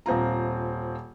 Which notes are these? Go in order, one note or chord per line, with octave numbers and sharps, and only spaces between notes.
D#1 C4 F4 A#5